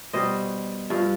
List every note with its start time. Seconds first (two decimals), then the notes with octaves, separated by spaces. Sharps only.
0.13 B2 G3 C5 D#5
0.90 G2 F3